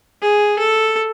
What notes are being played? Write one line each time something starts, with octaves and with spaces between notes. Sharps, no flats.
G#4
A4